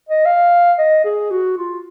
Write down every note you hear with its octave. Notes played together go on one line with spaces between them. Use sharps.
D#5
F5
D#5
G#4
F#4
F4